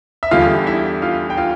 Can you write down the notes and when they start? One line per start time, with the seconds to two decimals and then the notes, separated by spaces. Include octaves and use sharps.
0.23 E5
0.31 E2 D3 G3 F4 F5
0.67 E4 E5
1.02 F4 F5
1.30 G5
1.37 F4 F5